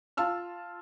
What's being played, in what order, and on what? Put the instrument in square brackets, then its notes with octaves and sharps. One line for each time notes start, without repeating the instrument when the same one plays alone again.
[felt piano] F4 F5 A5 E6 F6